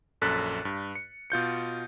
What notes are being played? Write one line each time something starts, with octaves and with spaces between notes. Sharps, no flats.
A#1 F#2 A4 F#6 A6 B6
G2
C#7
B2 F4 G6 C#7